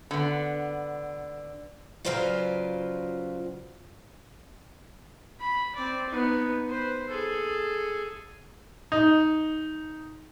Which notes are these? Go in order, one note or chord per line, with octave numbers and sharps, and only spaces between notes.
D3 B3
C#3 F#3 F4 B4 C5 D5
B5
C4 D5
B3 D#4
B4 C5
G#4 A4
D#4